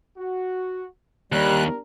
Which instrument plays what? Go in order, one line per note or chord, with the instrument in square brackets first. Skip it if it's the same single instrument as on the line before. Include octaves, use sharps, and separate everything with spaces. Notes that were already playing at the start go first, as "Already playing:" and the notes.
[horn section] F#4
[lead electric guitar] D#2 [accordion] G3 F#6 [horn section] D4 G4 A#4